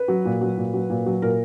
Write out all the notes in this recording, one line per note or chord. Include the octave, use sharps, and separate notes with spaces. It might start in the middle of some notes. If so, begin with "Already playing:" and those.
Already playing: B4
F#3
A#2
F#3
A#2
F#3
A#2
F#3
A#2 A#4